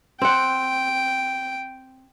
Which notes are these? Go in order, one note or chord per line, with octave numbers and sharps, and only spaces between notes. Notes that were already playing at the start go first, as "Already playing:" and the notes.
C4 F#5 G5